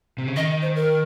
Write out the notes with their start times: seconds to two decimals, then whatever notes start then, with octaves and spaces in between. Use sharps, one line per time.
0.18 C3
0.28 C#3
0.36 D#3 D#5
0.62 C5
0.76 A#4